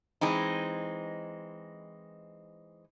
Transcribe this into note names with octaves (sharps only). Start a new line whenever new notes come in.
E3 G#3 C4 D#4